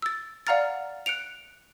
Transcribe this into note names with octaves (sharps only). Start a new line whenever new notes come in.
E6 A6
D5 F5 F#5 A#5 F6 A6
F#6 C#7 D7 F7